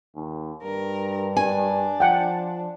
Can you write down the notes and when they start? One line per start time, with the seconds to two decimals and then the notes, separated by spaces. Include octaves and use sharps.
0.15 D#2
0.63 G2 A#4
1.37 D4 G#5
2.00 F3 F#5 G5